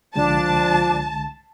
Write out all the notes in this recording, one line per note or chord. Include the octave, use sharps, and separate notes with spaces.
C2 D3 F3 G#3 D4 A5